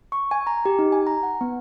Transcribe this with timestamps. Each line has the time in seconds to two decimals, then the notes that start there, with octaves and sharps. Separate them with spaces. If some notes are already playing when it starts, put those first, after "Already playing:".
0.12 C#6
0.31 G#5
0.47 A#5
0.65 G4
0.79 D#4
0.92 G#5
1.07 A#5
1.23 F#5
1.41 B3